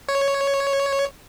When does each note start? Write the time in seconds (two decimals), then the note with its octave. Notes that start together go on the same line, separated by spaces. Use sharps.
0.08 C#5